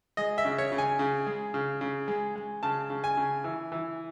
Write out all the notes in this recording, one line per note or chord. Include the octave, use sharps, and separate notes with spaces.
G#3 D#5
E5
C#3
C#5
C#3
G#5
C#3
G#3
C#3
C#3
G#3
G#3
C#3 A5
C#3
G#5
C#3
E3
E3